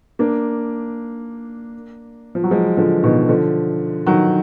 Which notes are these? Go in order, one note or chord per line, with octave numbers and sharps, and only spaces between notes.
A#3 D4
F3
F#3
F3 G#3
D3 F3
B2 D#3
D3 F3
D#3 F#3